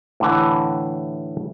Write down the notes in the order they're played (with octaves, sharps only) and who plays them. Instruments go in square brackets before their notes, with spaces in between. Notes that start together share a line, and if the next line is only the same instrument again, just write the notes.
[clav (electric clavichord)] A2 D3 E3